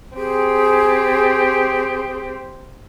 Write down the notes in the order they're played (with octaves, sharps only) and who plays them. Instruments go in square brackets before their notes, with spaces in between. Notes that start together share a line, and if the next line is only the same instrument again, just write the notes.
[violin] C4 G4 [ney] G#4